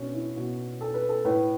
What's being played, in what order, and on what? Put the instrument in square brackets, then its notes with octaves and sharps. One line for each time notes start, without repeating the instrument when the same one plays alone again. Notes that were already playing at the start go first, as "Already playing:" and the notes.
Already playing: [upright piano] B2 C#4 D4
E4
B2 F#4
A4
B4
A4
A2 B4